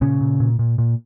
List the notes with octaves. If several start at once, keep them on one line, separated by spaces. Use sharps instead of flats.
A#2 C#3 C#4
A#2
A#2
A#2
A#2